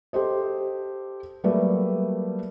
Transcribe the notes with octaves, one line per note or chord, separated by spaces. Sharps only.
G4 A4 C5 D#5
F#3 G3 A3 A#3 B4 D5